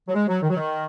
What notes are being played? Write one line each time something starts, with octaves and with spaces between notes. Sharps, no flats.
F#3
G#3
F#3
D#3
F#3
D#3